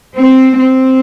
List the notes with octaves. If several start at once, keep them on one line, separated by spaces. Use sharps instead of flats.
C4
C4